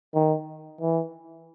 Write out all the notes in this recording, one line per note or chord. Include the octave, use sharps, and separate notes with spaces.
D#3
E3